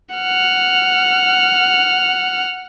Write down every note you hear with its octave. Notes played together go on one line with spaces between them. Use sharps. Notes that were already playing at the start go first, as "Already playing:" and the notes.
F#5 F6